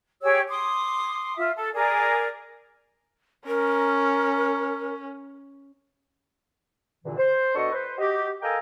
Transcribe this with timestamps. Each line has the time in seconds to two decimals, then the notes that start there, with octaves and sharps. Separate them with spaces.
0.22 G4 G#4 C#5 E6
0.48 C6 D6 D#6
1.36 F4 E5
1.55 A4
1.74 G#4 A#4 D5 D6
3.47 C#4 A#4
7.05 E2 G2 A#2 D3 E3
7.18 C5
7.55 B2 D4 A4 D#5 C#6
7.72 B4 C5
7.98 F#4 G4 D#5
8.42 A4 A#4 D#5 F5 G5 G#5